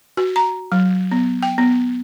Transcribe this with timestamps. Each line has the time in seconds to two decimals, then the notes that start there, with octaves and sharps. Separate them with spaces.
0.17 F#4
0.36 A#5
0.72 F#3
1.11 B3
1.43 G5
1.58 B3